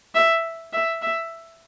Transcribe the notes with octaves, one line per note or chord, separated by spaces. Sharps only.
E5
E5
E5